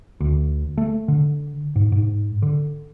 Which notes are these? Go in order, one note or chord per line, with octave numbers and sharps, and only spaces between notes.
D2
A3
D3
G#2
G#2
D3